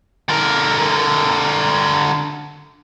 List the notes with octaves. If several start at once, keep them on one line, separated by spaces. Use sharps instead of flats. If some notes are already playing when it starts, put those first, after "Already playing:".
D3 A#4